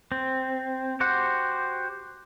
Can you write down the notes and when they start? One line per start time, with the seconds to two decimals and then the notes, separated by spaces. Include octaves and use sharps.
0.12 C4
1.00 F#4 G4 C5 F#5